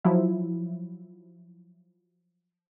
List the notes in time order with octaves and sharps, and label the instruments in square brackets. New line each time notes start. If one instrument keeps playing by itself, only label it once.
[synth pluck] F3 F#3 E4